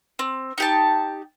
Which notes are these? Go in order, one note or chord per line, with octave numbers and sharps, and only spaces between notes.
C4
D#4 G4 A5